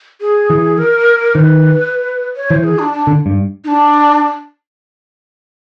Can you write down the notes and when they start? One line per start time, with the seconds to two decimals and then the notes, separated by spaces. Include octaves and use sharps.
0.21 G#4
0.50 E3
0.78 A#4
1.35 D#3 C5
1.40 B4
2.36 C#5
2.50 E3 C5
2.64 G#4
2.79 D4
2.93 D4
3.07 D3
3.26 G2
3.64 D#4
3.68 D4